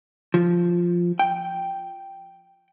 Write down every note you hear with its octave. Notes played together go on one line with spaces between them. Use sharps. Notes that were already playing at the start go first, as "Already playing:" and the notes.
F3
G5